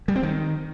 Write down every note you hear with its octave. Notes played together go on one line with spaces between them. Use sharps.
G3
C4
D#3